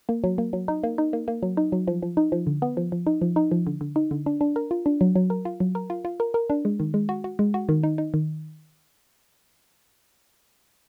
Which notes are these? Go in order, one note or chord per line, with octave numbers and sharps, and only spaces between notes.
A#3
F#3
A#3
F#3
D#4
A#3
D#4
A#3
A#3
F#3
D#4
F#3
F3
F3
D#4
F3
D3
B3
F3
F3
D#4
F3
D#4
F3
D3
D3
D#4
D3
D4
D4
A#4
F4
D4
F#3
F#3
A#4
F4
F#3
A#4
F4
F4
A#4
A#4
D4
G#3
D#3
G#3
F#4
F#4
G#3
F#4
D#3
D#4
D#4
D#3